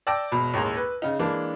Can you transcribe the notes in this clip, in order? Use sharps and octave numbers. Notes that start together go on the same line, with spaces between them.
D5 G5 A5 E6 A#6 D7
E1 B2
A1 D#2 G#3 A#5 C6
B4
C#3 D#4
E3 G#3 A#3 D4